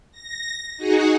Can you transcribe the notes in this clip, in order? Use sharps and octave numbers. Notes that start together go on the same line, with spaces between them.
A#6
D#4 F#4 G#4 F#5